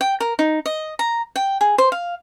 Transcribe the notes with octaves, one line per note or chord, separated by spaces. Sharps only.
G5
A#4
D#4
D#5
A#5
G5
G#4
C5
F5